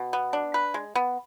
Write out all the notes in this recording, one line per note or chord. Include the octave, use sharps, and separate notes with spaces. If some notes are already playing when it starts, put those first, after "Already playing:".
Already playing: B2
B3
D4
B4
G#3
B3